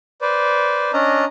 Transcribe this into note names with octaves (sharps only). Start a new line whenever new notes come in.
B4 C5 D5
C#4 D4 D#5 A#5